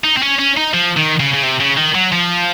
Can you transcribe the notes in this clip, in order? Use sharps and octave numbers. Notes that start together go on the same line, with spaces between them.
D#4
C4
C#4
C#4
D#4
F3
D#3
C#3
C#3
C3
C#3
D#3
F#3
F3